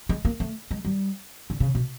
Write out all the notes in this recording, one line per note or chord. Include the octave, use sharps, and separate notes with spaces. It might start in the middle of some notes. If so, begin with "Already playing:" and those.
G#3
A#3
A3
G#3
G3
D3
C#3
B2